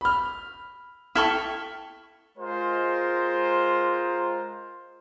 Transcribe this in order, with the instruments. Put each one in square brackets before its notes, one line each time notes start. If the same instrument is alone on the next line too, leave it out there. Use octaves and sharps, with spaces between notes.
[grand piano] B5 F6
[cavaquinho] E4 A4 C#6 [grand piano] G5 F6
[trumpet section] G#3 F4 A#4 C5